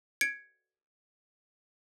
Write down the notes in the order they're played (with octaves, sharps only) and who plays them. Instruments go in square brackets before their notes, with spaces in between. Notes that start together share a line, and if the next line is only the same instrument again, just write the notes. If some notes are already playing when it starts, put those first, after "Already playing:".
[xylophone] G#6 C#7 D7